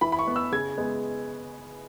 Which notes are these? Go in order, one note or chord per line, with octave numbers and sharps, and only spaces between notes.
E3 B5
B5
C#6
B3
E6
C#3 G#6
G#3 B3